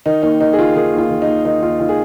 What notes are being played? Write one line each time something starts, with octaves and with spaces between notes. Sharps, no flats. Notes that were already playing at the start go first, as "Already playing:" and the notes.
D#3 D#4
D#2 D#4
D#3 D#4
G#4
D#2 F4
D#3 G#4
D#2
F4
D#3
D#4
D#2
D#3 D#4
D#2 F4
D#3 F4
G#4